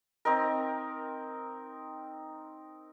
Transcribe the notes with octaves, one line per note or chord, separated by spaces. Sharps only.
C4 D#4 A#4